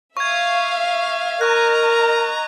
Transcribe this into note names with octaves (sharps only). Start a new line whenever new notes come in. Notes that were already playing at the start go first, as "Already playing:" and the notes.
E5 F5 C#6 G#6
A#4 D#5 A#5 C#6 F#6